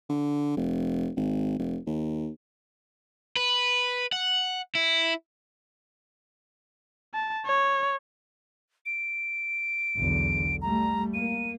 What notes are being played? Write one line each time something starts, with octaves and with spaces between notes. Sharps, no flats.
D3
F1
G#1
F1
D#2
B4
F#5
E4
A5
C#5
D7
B1 E2 D3
G3 A3 A#5
A#3 D#7